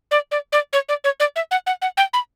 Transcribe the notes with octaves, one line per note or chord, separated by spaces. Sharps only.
D5
D5
D5
C#5
D5
C#5
D5
E5
F#5
F#5
F#5
G5
B5